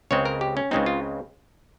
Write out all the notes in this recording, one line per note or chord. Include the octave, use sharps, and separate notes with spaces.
C#2 C#3 G#3 C4 C#5
A#4
G4
C#4
C#2 C#3 G#3 C4 D#4
F4